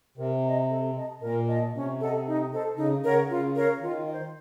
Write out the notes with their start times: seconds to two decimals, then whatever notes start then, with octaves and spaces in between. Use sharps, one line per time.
0.17 C3 A#4
0.43 D#5 A#5
0.70 A4
0.95 D#5 A5
1.22 A#2 A#4
1.48 D#5 A5
1.73 C3 C#4
1.99 A4 D#5 F#5
2.26 D#4
2.52 A4 C5 D#5
2.77 C#3 D#4
3.03 C#3 A#4 C#5 F#5
3.29 C#3 F4
3.55 A#4 C#5 F5
3.80 D#3 F4
4.07 D#5
4.12 C5